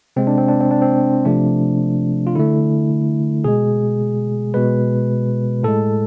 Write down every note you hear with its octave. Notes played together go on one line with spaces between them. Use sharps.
C3 G#3 C4
D4
C4
D4
C4
D4
C4
C3 F3 A3 D4
F4
D3 A3 E4
B2 G#3 G#4
B2 G#3 B4
A2 G#3 A4